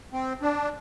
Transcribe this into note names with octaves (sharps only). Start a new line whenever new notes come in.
C4
D4